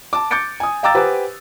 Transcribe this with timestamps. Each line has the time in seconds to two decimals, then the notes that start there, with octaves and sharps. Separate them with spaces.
0.13 A5 D6
0.31 D6 G6 A6 C#7 D7
0.60 G#5 D#6
0.83 F5 G5 A#5 D6 E6 A6
0.94 G4 B4 C5 F#5 G#5 D6